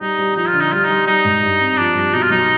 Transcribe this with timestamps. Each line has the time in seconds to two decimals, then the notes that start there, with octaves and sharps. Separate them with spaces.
0.01 G3 D#4
0.18 G3
0.36 F3 D#4
0.48 F4
0.54 D3
0.60 D#4
0.71 G3 F4
0.84 G3 D#4
1.07 G3 D#4
1.24 G#2
1.42 G2
1.60 C4
1.77 F3 D4
1.95 G2
2.13 B2 D#4
2.22 F4
2.30 B1 D#4